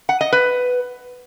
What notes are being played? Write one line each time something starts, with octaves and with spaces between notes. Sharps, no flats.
F#5
D#5
B4